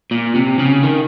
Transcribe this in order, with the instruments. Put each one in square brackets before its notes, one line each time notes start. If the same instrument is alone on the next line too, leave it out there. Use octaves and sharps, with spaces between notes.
[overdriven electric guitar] A#2
C3
C#3
D#3